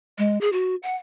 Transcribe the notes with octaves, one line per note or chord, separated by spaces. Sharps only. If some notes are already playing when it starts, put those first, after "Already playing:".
G#3
G#4
F#4
F#5